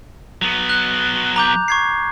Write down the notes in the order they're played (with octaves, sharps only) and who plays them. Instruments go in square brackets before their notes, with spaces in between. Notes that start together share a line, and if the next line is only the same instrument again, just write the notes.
[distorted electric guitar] F#3 B3
[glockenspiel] F#6
A#5 D6 G6
C#6 G#6 C7